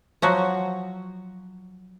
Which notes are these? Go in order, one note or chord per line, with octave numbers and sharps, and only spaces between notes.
F3 F#3 F#4